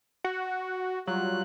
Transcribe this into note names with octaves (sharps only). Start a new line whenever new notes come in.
F#4
F#3 G3 F4 F#6